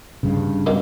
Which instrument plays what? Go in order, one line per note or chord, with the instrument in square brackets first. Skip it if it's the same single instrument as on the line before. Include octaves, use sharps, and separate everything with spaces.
[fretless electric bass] G2 C#3
[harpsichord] B2 G3 A#3